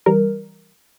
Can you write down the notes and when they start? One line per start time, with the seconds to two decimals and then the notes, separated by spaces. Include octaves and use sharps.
0.06 E3 G3 A#4